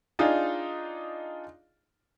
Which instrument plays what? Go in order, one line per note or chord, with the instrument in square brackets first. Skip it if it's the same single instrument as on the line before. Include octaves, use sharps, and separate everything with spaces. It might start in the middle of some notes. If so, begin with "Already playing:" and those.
[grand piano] D4 D#4 F4 G#4